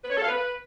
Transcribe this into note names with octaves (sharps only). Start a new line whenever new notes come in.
B4
C#5
A4
F5
B4